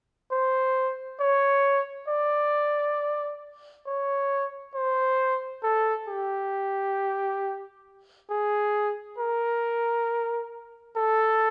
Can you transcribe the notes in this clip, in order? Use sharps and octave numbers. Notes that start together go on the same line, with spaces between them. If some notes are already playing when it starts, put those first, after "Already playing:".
C5
C#5
D5
C#5
C5
A4
G4
G#4
A#4
A4